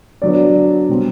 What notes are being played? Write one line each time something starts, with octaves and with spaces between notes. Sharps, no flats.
D3 F#3 B3 D5
B2 G3 C4